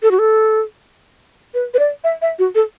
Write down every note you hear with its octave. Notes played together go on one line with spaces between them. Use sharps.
A4
F#4
A4
B4
B4
D5
E5
E5
F#4
A4